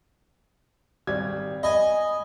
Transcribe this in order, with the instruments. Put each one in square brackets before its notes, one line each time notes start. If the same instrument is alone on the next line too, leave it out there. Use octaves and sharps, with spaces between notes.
[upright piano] G#1 G3 G#6
[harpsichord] D#5 G#5 [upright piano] B5